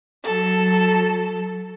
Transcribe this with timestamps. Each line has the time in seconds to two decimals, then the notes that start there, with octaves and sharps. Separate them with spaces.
0.25 F#3 A4